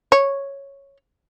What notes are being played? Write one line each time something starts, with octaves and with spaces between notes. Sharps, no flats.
C#5